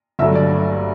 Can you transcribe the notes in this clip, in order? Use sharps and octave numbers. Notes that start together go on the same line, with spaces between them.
G1 G2 F#3 A3 E5
D5